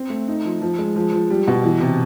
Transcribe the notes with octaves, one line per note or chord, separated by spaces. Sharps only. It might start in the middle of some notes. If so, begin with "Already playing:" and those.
Already playing: C4
A3
D#4
F3
F3
G#3
F3
F3
G3
B2
E3
C3